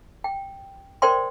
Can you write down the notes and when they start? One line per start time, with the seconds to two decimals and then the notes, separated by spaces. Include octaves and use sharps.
0.24 G5
1.02 A#4 C5 D5 G5 C6